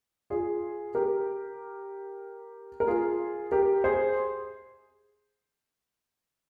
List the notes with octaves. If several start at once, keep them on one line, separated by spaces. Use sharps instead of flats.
F4 G#4
G4 A#4
A#4
F4 G#4
G4 A#4
G#4 C5